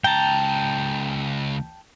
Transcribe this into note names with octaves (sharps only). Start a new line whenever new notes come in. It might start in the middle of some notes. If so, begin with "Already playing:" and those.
C#2 G5 A5 A#5